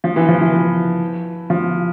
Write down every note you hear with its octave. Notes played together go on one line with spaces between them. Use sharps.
F3
E3
F3
E3
E3
F3